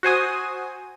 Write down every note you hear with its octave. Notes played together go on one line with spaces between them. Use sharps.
F#4 C5 G#5 D#6